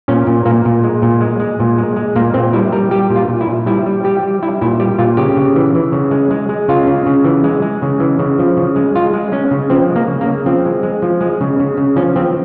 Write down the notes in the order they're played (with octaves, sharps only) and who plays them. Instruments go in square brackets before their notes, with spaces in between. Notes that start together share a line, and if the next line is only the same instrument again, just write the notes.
[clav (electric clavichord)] A#2 C#4
A#2
A#2 A#3
A#2
G#3
A#2
G#3
G#3
A#2
G#3
G#3
A#2 A#3
A#2 C4
G3 E4
G3 A#4
G3 G4
A#2
F4
A#2
E4
A#2
G3 E4
G3
G3 G4
G3
G3 E4
A#2 E4
G3 G4
A#2 F4
C#3 G4
C#3
E3
E3
C#3
G#3
G#3
G#3
C#3 F4
C#3
C#3
E3
G#3
G#3
C#3
E3
C#3
F3
C#3
G#3
G#3 F4
G#3
G#3 C#4
C#3
F3 C4
G#3
A#3
C#3
A#3
C#3
F3 C4
G#3
G#3
F3
G#3
C#3
C#3
C#3
F3 C#4
F3 C4